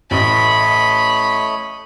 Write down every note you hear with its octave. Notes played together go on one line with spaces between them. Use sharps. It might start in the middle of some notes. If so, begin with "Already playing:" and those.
A1 A3 C#5 D#5 B5